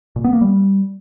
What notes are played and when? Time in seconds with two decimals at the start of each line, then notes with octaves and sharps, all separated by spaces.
0.16 A#2
0.24 B3
0.33 A#3
0.41 G3